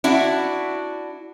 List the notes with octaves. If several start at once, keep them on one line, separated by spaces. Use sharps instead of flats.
D4 E4 F#4